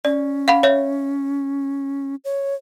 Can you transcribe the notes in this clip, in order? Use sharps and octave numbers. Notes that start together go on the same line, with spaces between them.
C#4 D5
F5 F#5 B5
C#5 E5
C#5